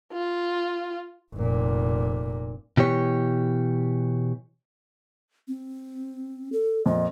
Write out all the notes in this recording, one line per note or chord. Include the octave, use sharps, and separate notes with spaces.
F4
F1 A#2
B2 E3 G4 C#5
C4
A4
F2 A#2 D#5